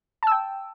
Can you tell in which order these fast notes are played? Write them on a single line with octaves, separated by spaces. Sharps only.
A5 E6 G5